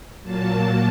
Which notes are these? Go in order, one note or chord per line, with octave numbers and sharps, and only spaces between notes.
A#2 F#3 A#3 A5